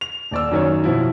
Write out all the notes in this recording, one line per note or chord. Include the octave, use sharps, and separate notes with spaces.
F7
D#1 D5 E6
F#2 D#3 C#5
B2 F3 E4